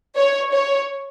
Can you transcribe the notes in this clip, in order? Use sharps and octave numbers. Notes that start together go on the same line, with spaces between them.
C#5
C#5